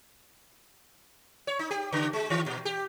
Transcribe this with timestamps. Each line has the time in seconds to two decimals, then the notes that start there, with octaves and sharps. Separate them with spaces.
1.47 C#5
1.59 D#4
1.71 G4
1.92 C#3
2.13 G#3
2.30 D#3
2.46 A#2
2.65 G4